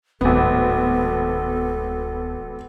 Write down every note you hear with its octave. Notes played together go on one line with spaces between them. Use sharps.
D1 G#1 B3 A4